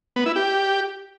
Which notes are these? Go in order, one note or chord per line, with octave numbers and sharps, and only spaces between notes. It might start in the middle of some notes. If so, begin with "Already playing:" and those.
B3
E4
G4